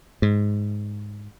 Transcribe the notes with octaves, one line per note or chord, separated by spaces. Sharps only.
G#2